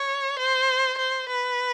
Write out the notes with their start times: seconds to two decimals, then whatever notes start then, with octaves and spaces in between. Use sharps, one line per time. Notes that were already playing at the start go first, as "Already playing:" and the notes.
Already playing: C#5
0.39 C5
0.98 C5
1.29 B4